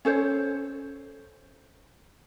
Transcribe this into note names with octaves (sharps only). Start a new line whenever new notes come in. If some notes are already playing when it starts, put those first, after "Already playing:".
C#4 A4 C5 C#5